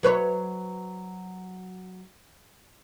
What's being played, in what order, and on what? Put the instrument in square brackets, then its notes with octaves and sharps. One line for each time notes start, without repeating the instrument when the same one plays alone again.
[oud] F#3 B4 C#5